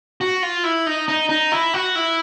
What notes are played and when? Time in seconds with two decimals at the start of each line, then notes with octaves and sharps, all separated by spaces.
0.21 F#4
0.43 F4
0.64 E4
0.86 D#4
1.08 D#4
1.29 D#4
1.52 E4
1.74 F#4
1.96 E4